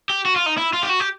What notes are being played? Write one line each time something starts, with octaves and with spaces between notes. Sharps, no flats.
G4
F#4
F4
D#4
E4
F4
G4
F#4
G4